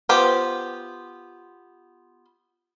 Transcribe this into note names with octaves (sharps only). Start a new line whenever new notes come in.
B3 F4 G4 C5